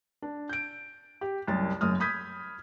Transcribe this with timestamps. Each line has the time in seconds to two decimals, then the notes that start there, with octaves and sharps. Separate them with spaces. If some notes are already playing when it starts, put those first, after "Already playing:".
0.22 D4
0.49 G6 D7
1.21 G4
1.48 C2 F#2 A6
1.81 F#1 F#2 D#6 F6
2.00 B5 D#6 G6 G#6 B6